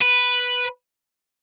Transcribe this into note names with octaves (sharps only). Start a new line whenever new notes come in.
B4